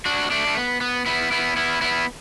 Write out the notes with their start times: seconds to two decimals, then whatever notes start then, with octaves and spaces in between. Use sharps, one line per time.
0.05 D4 F#4
0.31 A3 D4
0.47 A3
0.57 B3
0.81 B3
1.06 B3 E4
1.31 B3 E4
1.56 B3 E4
1.81 B3 E4